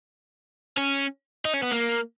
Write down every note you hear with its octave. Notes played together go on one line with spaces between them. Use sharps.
C#4
D#4
C#4
B3
A#3